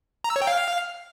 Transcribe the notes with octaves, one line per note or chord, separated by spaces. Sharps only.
A#5
E6
C#5
G5
F5